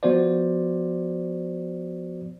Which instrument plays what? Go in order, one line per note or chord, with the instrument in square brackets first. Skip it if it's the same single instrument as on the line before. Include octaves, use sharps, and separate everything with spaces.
[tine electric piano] F3 B3 F#4 C5 D5